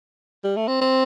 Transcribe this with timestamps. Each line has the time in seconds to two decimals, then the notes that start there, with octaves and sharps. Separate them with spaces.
0.44 G3
0.56 A3
0.68 C4
0.81 C4